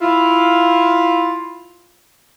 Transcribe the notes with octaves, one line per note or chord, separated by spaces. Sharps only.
E4 F4